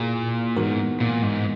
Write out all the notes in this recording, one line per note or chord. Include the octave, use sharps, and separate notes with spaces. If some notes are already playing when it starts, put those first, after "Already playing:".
Already playing: A#2 A#3 E4 G#4
G#2 E3 B3 F#4 A#4
A#2
G#2